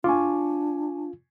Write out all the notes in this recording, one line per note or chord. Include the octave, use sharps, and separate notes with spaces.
D4 F4 G#5 C#6 D6